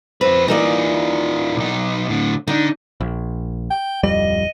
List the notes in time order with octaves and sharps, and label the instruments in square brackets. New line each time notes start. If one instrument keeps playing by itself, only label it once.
[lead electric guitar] F2 B4 [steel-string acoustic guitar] C4
[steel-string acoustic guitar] E3 A#3 D5 [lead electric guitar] D#4 F4
[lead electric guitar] B1 D#4
A2 D3
[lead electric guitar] D3 D4 [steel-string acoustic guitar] D#4
[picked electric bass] A#1
[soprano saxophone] G5
[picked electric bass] D1 F2 G3 [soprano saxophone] D#5